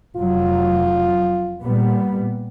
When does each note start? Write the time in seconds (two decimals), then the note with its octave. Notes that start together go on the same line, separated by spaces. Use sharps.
0.16 F1 F#3 F4
1.62 A#2 G3 B3